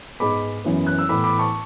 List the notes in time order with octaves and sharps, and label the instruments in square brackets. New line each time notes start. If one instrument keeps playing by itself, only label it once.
[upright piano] G#2 G#3 B3 B5 D6
F#2 E3 B3
F#6
E6
A2 E3 B3 B5 D6
B5 D6
A5 C#6